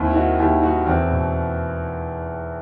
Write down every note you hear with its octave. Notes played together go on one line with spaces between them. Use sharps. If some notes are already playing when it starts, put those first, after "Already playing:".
Already playing: D#2 C4 E4
E4
D#3 D#4 F#4
D#2 E4 G4
D#3 D#4 F#4
E2 C4 E4
B2